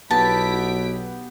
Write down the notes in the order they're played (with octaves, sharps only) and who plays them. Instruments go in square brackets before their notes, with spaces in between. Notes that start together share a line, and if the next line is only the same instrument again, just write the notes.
[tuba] B1 [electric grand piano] B3 G4 [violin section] E4 B6 D7 [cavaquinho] A5